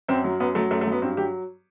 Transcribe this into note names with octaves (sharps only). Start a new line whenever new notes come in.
F#2 C4
F#3
F#2 B3
F#3 A3
F#2 A3
A3
F#3 B3
G2 C4
F#3 G4